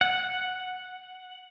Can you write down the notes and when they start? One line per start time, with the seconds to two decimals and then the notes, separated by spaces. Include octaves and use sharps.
0.01 F#5